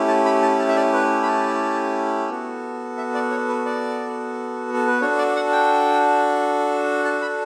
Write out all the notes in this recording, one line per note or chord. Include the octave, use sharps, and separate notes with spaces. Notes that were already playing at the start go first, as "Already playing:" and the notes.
Already playing: A3 C#4 E4 G4
A5
B5
A5
A5
E5
D5
B4
B5
A5
B3 F#4 A4
E5
D5
C#5
B4
D5
A4
B4
D4 F#4 A4 C#5
D5
F#5
G5
A5
B5